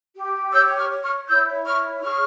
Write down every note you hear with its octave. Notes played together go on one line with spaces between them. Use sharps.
G4
C#5 E6 G6
C#6 F6
C#5
C#6 F6
E4 E6 G6
C#5 C#6 F6
G#4 C#6 F6